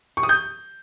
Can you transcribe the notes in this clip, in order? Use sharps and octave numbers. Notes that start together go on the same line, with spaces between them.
C#6
D#6
G6